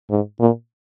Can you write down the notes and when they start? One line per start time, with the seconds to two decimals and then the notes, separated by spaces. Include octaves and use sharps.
0.10 G#2
0.40 A#2